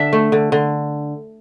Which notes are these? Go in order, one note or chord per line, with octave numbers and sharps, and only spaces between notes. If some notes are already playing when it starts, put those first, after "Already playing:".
Already playing: D3 D4 E5
A3
D3
D3